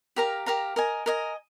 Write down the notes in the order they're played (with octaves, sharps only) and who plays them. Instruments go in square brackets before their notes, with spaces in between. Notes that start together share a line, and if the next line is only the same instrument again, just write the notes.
[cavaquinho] G4 A#4 F5 A#5
G4 A#4 F5 A#5
A#4 D#5 G#5
A#4 D#5 G#5